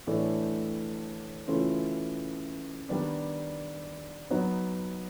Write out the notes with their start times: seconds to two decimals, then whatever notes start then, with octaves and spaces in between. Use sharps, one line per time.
0.07 A2 E3 A3 D4
1.48 C#3 E3 A3 C#4 F4
2.89 D#3 G3 B3 D4
4.30 F#3 B3 D#4